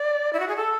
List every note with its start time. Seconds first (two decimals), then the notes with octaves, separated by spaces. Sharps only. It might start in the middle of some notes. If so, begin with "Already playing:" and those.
Already playing: D5
0.33 E4
0.40 F#4
0.48 G#4
0.56 A4